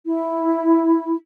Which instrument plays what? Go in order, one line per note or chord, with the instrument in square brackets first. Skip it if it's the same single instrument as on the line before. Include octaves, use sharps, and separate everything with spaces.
[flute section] E4